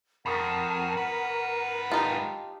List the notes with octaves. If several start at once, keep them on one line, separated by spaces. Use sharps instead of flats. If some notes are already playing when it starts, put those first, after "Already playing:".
F2 A#4 F#5 B5 C#6 D#6
G#2 B4
D#4 F4 G4 A5 F6